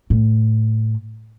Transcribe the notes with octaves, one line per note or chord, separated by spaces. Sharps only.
A2